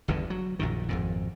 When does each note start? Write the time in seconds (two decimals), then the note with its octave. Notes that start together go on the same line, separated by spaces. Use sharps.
0.08 G1 E2 G2 D3
0.30 F#3
0.59 A#1 F#2 D#3
0.89 G#1 F2 A#2